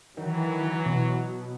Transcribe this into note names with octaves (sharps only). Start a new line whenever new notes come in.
D#3 E3 F#3
B2